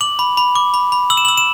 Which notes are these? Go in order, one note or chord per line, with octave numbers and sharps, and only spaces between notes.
D6 F#7
B5
B5
D6
B5
B5
E6 F#7
E7
E6 F#7
E7